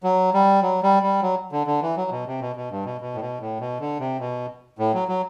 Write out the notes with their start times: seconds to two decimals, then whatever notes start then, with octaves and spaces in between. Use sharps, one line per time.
0.03 F#3
0.34 G3
0.62 F#3
0.83 G3
1.03 G3
1.22 F#3
1.52 D3
1.67 D3
1.82 E3
1.97 F#3
2.11 B2
2.27 C3
2.41 B2
2.56 B2
2.71 G2
2.85 B2
3.01 B2
3.15 A2
3.21 B2
3.41 A2
3.60 B2
3.80 D3
3.99 C3
4.20 B2
4.79 A2
4.94 F#3
5.08 F#3